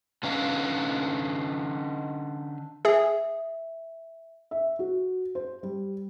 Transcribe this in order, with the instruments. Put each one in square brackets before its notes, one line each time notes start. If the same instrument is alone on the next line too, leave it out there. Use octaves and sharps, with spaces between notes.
[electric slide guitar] D3 C#4 D#4 B4 F5
[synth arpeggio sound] G#4 [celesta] E5
[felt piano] E5
F#4
C5
G3